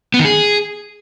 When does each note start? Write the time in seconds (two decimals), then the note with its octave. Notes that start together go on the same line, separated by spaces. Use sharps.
0.14 B3
0.19 D#3
0.25 G#4